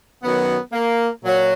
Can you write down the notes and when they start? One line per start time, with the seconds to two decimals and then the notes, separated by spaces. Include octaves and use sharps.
0.22 F#2 D#3 F#3 B3
0.73 A#3
1.23 A#2 F#3